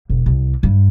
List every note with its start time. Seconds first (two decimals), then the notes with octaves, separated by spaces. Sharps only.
0.10 E1
0.26 C2
0.63 G2